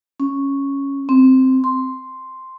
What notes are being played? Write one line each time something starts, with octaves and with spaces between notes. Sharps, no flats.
C#4
C4
C6